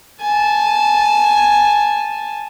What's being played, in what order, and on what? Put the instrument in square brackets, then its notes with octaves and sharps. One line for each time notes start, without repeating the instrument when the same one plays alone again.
[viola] G#5 A5